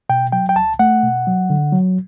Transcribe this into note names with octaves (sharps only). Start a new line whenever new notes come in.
B2 G5
F#3 G5
G5
C#2 A5
A3 F#5
B2
F#3
D3
F#3